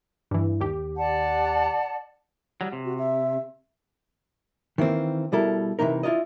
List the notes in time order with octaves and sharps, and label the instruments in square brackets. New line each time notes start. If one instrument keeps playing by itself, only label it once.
[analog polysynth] G2 E3
D#2 G4
[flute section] D5 F#5 A5
[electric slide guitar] F#3 G3
C3
[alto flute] F#4
E5
[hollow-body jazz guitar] D#3 E3 A#3 C4
B2 G3 E4 A4 A#4
C3 D#3 E3 D#4 A#4
E4 F4 D5 D#5